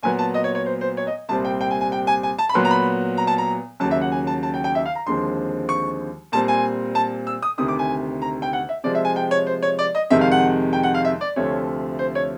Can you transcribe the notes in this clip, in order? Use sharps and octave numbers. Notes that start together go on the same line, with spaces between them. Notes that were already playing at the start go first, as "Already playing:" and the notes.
A#2 F#3 B3 G#5
A5
D#5
C#5
C#5
C5
C5
C#5
D#5
C2 A#2 G3 C4 A5
G5
G5
G#5
G#5
G5
G#5
G#5
A5
B5
A#2 F#3 B3 C6
A#5
B5
A#5
A5
A#5
D#2 C#3 F#3 A5
E5
F#5
G#5
A5
A5
G5
G5
E5
F5
A#5
D#2 D3 F3 G#3 C4 C6
C#6
A#2 G3 C4 A5
G#5
A5
E6
D#6
D2 C3 D#3 D#6
D6
G#5
A#5
G5
F#5
E5
C3 F3 G#3 D5
E5
G#5
G5
C#5
C5
C#5
D5
D#5
F2 C3 D#3 G#3 E5
F5
F#5
G5
F#5
F5
E5
D5
D2 C3 F3 A3 C#5
C5
C#5